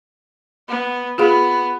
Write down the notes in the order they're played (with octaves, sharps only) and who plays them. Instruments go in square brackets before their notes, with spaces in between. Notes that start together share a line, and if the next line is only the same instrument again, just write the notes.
[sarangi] B3
[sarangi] B3 [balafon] F4 G#4 F5